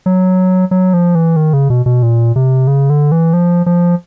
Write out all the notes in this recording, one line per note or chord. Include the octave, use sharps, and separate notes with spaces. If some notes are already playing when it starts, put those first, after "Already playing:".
F#3
F#3
F3
E3
D#3
C#3
B2
B2
A#2
C3
C#3
D3
E3
F3
F3